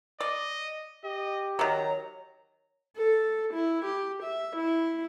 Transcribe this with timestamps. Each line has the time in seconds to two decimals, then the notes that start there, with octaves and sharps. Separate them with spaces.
0.20 D5 D#5
1.04 G4 D#5
1.59 D#3 F#3 C#5 A#5
2.97 A4
3.54 E4
3.85 G4
4.22 E5
4.56 E4